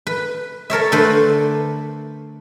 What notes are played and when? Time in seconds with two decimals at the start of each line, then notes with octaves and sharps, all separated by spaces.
0.07 B4
0.70 A4 A#4 C#5 E5
0.92 D3 A3 A4 B4 C5